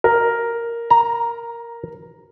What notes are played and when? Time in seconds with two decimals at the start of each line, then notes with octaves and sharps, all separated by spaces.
0.04 A#4
0.90 A#5